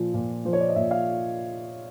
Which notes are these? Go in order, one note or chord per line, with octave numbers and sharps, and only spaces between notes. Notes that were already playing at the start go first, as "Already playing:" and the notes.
Already playing: A#2 F3
A#2
F3 C5
C#5
D5
D#5
A#2 E5
F5